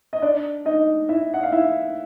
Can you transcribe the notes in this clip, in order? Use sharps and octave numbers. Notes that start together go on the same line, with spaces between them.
D#5
D4 D5
D#4 D#5
E4 E5
F#5
F5
E4 E5